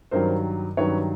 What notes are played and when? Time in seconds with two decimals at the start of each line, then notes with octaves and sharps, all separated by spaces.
0.11 G2 D#3 F#3 A#4 C5
0.77 G2 D#3 F#3 B4 C#5